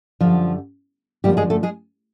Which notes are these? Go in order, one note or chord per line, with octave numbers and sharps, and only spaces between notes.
F#2 D3 F3 G3 F4
F#2 D3 F3 G3 A#3 G4
G#3 G#4
A3 A4
G#3 G#4